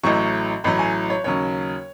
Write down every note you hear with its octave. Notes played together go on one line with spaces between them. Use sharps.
A1 A2 F#3 C#6
A1 A2 F#3 B5
G#5
C#5
D#2 C#3 F#3 C#5